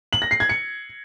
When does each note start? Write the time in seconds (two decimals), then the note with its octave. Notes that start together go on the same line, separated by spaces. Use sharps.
0.13 F#7
0.22 A#6
0.31 C7
0.40 G#6
0.49 C#7